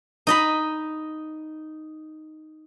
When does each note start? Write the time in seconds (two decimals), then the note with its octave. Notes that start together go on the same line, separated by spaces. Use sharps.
0.27 D#4 D#5 B5